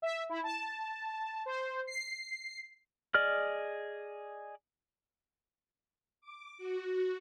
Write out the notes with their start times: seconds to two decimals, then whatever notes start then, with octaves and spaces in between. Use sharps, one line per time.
0.02 E5
0.29 E4
0.44 A5
1.46 C5
1.87 C7
3.14 G#4 D5 D#5 F6
6.21 D6
6.58 F#4